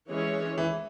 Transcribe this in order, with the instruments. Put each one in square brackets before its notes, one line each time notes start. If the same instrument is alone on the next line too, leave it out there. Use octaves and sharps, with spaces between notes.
[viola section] E3 G#3 C#4 G#4 C#5
[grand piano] E3